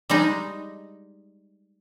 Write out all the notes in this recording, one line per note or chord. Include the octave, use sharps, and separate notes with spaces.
G3 G#3 D#4 D#5